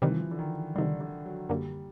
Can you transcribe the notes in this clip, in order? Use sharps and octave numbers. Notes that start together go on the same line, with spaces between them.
C3 D#3 E3 G3
F3
E3
D3
D#3
C3 D3 D#3 G3
D3
F#3
F#2 D3 F#3 G3 A#3